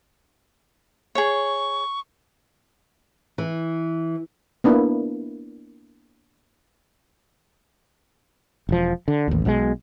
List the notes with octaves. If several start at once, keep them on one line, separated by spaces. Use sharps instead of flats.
G#4 C#5 C#6
E3
A#3 B3 D4 E4
E1 F3
D3
A1 D#2
B1 B2 D#3 G#3